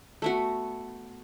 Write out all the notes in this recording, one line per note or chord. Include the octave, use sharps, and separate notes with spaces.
A3 B3 F#4